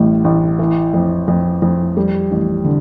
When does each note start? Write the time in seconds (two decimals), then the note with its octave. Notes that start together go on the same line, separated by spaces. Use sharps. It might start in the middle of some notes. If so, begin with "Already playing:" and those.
Already playing: A1 A2 G3
0.24 A1
0.59 E3
0.94 F2
1.28 F2
1.62 F2
1.97 G3
2.31 A1
2.64 D3